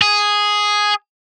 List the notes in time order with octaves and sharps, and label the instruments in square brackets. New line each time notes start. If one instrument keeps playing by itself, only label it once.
[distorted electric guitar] G#4